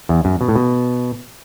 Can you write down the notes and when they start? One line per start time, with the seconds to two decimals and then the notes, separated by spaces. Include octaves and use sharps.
0.09 E2
0.25 F#2
0.41 B2
0.48 A2
0.55 B2